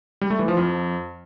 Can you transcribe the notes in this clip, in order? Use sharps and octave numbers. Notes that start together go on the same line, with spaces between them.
G3
A3
E3
F3
F2